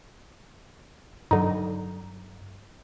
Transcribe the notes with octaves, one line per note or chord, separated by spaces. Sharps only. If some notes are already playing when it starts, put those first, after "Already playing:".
G2 D3 F#3 D#4